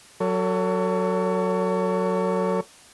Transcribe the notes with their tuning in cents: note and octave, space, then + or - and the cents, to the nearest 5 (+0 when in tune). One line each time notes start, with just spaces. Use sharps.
F#3 +0 A4 +35 C#5 +25